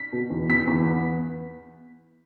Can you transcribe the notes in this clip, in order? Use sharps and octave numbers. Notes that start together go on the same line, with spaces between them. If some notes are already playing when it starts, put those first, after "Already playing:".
Already playing: B6
B2
E2
E2 B6
E2
B3